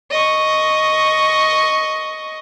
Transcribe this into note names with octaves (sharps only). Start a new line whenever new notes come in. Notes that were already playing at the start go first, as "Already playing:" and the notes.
D#5 C#6